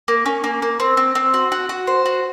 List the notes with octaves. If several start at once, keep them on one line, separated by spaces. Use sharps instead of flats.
A#3
C#4
A#3
A#3
C4
C4
C4
F#4
F#4
F#4
C5
F#4